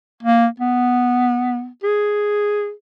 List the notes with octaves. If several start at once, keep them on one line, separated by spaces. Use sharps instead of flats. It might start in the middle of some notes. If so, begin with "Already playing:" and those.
A#3
B3
G#4